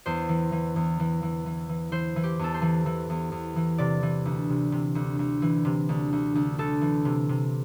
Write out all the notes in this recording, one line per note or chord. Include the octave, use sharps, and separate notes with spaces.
E2 C5
E3
E3
E2
E3
E3
E3
E3
E3 C5
E3
G4
E2 A4
C5
E3
E3
E2
E2
E3
C3 D5
E3
D2
C3
C3
D2
D2
E3
C3
D2
D2
D2
D2 A4
E3
C3
C3